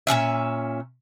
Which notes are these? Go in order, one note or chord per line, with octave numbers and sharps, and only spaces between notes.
A#2 F3 C#4 E5